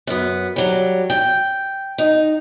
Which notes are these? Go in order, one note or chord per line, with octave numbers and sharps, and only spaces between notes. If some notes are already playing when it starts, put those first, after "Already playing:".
F#2 B3
F#3 G3
G5
D#4